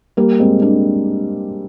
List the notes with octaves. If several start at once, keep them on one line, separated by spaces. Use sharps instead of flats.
G3 A#3
G#3 C4
A#3 D4